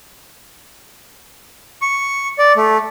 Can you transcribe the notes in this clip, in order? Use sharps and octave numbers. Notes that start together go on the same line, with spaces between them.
C#6
D5
A3